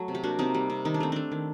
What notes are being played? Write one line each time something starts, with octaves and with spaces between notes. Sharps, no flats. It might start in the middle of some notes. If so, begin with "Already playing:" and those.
Already playing: F#3 A3
C3
G4
A#3 D4 F#4
C3 C4 D#4
G3
C3
D#3 D#4
D4
A3 C4
A3 D4
D#3